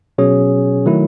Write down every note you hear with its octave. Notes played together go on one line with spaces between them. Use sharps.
B2 F#3 C#4 G#4 C#5
D#3 F#3 A3 E4